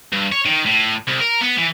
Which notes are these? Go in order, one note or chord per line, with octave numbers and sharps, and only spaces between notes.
G2
C#5
D#3
A2
C2
A#4
B3
E3